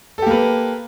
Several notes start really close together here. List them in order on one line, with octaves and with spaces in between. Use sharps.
A4 G4 A#3 B4